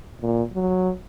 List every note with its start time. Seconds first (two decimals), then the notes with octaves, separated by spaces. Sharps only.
0.21 A#2
0.54 F#3